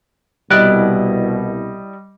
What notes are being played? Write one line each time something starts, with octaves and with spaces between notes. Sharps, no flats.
C2 B2 G3 E4 D5 D#5 F#6